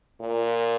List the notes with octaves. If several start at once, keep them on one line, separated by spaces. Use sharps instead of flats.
A#2